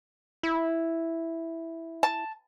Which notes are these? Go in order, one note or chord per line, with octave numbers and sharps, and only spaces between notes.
E4
A5